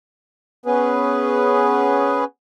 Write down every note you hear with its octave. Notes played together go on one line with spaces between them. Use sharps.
B3 C#4 G#4 B4